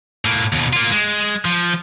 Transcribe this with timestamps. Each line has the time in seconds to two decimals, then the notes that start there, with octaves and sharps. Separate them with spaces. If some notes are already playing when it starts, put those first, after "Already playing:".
0.25 A2 A#3
0.52 D#2 B2
0.73 A#3 F4
0.92 G#3
1.45 F3